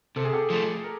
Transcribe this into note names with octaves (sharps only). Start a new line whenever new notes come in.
C3 A4
G#4
G4 A4
F3 A3
A#4